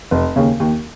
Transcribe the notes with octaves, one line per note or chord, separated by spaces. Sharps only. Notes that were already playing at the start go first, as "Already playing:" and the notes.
F1
D#2 C#3
D#2